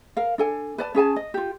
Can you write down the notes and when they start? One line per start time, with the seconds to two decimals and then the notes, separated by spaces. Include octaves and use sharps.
0.17 A#4 F5
0.38 D4 A4 G#5
0.78 B4 D5 A5
0.95 C#4 G#4 G#5 A5
1.16 D#5
1.34 F4 G4